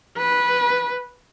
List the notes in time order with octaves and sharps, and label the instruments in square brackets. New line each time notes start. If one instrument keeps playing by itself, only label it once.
[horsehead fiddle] B4